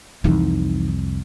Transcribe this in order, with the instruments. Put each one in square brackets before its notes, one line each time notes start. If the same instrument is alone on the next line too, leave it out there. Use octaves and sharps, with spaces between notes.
[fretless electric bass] C2 F2 [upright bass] E3 D#4